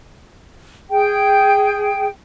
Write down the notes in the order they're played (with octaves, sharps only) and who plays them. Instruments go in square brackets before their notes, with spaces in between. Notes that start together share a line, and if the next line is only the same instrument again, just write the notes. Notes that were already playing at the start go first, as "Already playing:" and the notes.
[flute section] G#4 G5